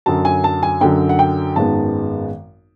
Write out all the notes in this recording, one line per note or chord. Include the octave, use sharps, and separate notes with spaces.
F#2 D3 F#3 A5
G#5
A5
G#5
F#2 D3 F#3 G5
F#5
G5
G#1 F#2 D#3 G#3 B3 A5